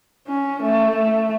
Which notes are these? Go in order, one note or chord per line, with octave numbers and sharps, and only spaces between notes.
C#4
A3
A3